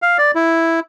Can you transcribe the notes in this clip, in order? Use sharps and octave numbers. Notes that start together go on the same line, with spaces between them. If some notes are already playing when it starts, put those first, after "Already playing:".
F5
D5
E4